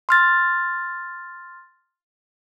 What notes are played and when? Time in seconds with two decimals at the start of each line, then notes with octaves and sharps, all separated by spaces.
0.09 C6 F6 A6